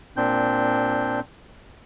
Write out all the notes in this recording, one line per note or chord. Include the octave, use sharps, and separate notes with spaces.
A#2 C4 D4 G6